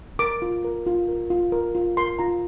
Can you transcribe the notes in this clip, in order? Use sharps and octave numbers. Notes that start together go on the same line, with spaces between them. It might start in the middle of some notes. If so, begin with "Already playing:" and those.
A#4 D6
F4
A#4
F4
A#4
F4
A#4
F4
A#4 C6
F4 A#5